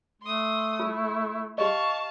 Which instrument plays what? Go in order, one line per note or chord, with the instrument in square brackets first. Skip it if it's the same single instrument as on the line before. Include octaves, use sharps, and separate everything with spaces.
[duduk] A3 [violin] C6 D#6
[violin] E4 [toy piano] F4
[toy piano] G4 D#5 [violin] F5 A5 [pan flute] C#6